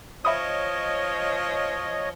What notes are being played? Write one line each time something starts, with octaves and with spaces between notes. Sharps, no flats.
F3 C#5 D#5 E5 B5 D#6